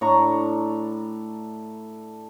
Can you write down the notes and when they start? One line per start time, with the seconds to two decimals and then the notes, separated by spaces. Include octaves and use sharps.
0.01 A2 D4 A#5 C#6